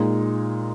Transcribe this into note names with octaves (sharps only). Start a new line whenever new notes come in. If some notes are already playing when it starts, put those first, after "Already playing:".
Already playing: A#2 G#3 D#4